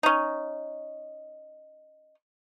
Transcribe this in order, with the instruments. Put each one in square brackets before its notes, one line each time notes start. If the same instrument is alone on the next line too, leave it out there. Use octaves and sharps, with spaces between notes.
[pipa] C#4 D#4